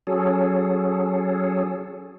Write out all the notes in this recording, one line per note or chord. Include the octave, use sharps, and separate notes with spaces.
F#3 C#4 G#4 A4